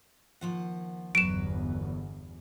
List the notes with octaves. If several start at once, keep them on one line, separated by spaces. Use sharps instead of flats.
D#2 F3 F#5
G1 E2 F#3 B4 D7 E7